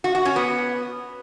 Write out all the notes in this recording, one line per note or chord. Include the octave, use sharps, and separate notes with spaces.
F#4
F#4
C#4
B3